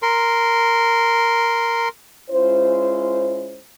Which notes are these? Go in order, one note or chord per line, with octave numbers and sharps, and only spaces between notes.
A#4 C6
G#3 C#4 E4 F4 C5